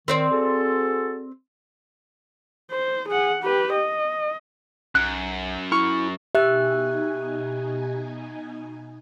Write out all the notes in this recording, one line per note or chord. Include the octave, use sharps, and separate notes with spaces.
D#3 C4 C5 D5
F#4 G#4 A4
C5
G#4 F#5
G4 B4
D#5
B1 F#2 F#6
E4 C#6 F6
B2 D#4 G4 E5 G#5 F#6